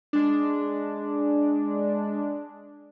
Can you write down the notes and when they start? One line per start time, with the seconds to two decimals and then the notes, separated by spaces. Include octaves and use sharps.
0.13 G#3 D4